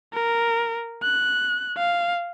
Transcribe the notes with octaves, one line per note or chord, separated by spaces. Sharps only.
A#4
F#6
F5